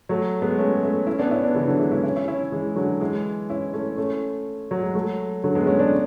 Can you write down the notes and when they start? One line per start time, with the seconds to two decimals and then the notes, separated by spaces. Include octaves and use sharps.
0.09 F#3 A3
0.42 G#3 B3
0.58 A3 C#4
0.83 A3 C#4
1.06 C#4 E4
1.19 B3 D4
1.31 C#4 E4
1.43 B3 D4
1.55 C#3 E3
1.67 D3 F#3
1.79 E3 G#3
1.91 C#4 E4
2.03 C#4 E4
2.16 C#4 E4
2.28 C#4 E4
2.52 E3 G#3
2.76 D3 F#3
3.01 E3 G#3
3.50 C#4 E4
3.74 A3 C#4
3.97 A3 C#4
4.71 F#3
4.82 G#3
4.94 F#3 A3
5.44 D3 F#3
5.55 G#3 B3
5.67 A3 C#4
5.79 B3 D4